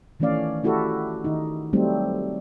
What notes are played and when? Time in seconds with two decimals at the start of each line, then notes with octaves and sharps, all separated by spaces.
0.20 D#3 E3 A3 C#4 D5 F5
0.64 A3 E4 F#4 G4 A4
1.24 D#3 D#4
1.73 F#3 G3 A3 C4 D#4